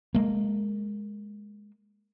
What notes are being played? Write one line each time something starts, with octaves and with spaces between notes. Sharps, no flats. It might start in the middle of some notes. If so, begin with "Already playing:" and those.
G#3 A#3